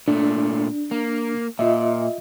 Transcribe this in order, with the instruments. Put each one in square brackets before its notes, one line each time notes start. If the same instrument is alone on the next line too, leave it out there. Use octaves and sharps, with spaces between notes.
[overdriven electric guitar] A#2 A3 [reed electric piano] D4
[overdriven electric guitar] A#3
[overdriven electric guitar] A#2 [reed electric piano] F4 D#5 E5